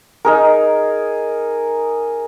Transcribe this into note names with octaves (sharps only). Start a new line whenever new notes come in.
D#4 G#4 A#4